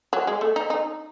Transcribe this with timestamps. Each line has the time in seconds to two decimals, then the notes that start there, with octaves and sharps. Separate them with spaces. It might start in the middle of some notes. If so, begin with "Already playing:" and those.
0.13 F#3
0.27 G#3
0.41 A3
0.56 D#4
0.70 D#4